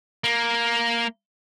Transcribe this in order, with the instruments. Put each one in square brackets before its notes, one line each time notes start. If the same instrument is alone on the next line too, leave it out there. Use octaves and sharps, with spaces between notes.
[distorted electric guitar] A#3